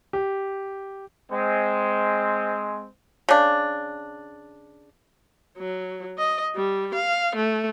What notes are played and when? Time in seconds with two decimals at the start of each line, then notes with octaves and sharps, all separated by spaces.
0.13 G4
1.31 G#3 C4
3.29 C#3 D4
5.58 F#3
6.18 D#5
6.56 G3
6.94 F5
7.36 A3